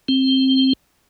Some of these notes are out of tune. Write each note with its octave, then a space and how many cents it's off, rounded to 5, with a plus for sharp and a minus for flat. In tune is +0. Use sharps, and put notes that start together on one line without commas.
C4 +15